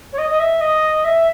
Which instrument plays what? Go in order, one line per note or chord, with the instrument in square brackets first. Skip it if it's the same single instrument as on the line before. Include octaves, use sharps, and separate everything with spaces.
[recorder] C#5
D#5
D#5
E5
D#5
E5